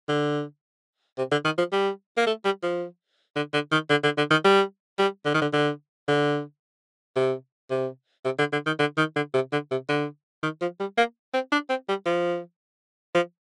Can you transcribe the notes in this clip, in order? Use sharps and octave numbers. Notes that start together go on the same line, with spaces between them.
D3
C3
D3
D#3
F3
G3
A#3
A3
G3
F3
D3
D3
D#3
D3
D3
D3
D#3
G3
G3
D3
D#3
D3
D3
D3
C3
C3
C3
D3
D3
D#3
D3
D#3
D3
C3
D3
C3
D3
D#3
F3
G3
A#3
C4
D4
C4
G3
F3
F3